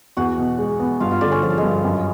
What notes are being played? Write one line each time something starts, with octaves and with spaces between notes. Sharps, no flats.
E2 F#4 F#5
B2
G#3
B3
G2 F4 F5
F4 F5
D3 D4 D5
C#4 C#5
F3 G#4
A4
G#3 G#4
G2
F#2